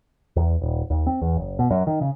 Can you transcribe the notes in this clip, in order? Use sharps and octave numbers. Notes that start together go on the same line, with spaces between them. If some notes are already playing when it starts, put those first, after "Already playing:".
E2
D#1
D#2
C4
E2
F#1
B2
F#2
D#3
C#3